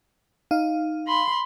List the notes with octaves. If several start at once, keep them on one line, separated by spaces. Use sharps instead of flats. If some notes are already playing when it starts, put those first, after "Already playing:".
D#4 F5
B5 C6